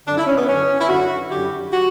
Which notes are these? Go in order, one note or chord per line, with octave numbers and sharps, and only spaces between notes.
F#2 D3 D4
E4
C#4
B3
F#2 D3 C#4
E4
F#2 D3 F#4
F#2 D3 G4
F#4